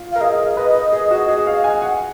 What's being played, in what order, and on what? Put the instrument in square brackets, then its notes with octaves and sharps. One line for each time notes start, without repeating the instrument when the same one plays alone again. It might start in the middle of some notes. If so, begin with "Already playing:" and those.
Already playing: [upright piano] F4
[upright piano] A#4 [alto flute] F5
[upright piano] G#4 [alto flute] D#5
[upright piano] A#4
B4
G#4
F#4
G#4
F5
G#5
F#5